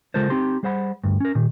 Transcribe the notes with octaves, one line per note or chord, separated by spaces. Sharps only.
C#3 G#3 F4 A4 A#4 C5
C4 D#4 G4 C6
G3 G#4 C5 F#5 B5
D2 G2
C#4 A#4
A#2 D#3